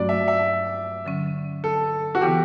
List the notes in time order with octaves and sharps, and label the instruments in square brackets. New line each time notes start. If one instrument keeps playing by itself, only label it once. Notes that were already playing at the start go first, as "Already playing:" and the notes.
Already playing: [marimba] G2 F#3 A3 C#4 F#4 [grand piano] D5
[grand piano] E5
E5
[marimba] D3 F#3 C#4
[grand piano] A4
F#4
[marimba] C#3 E3 B3 E4 [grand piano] G4